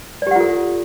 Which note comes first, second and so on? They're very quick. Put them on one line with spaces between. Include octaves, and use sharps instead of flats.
D5 G4 F#5 F4 A4